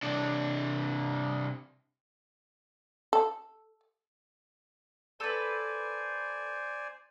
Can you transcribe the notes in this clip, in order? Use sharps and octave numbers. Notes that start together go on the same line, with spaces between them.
C3 D4
A4
A4 B4 C5 D5 G#5